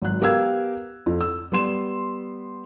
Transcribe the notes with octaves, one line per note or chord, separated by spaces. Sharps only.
G#1 F#3 F#6
B3 G4 A#4 F5 E6 G#6
F2
E6
G3 B3 C6 E7